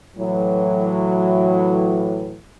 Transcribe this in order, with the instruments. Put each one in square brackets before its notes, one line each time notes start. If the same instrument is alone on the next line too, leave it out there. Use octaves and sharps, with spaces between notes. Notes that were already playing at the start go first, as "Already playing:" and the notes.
[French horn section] A2 E3 F#3